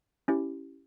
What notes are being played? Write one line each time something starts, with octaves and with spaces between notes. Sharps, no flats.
C#4 E4 G4